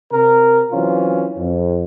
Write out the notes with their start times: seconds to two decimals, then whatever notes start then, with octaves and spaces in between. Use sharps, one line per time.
0.12 C3 A#4
0.72 E3 F#3 C4 C#4 F4
1.38 F2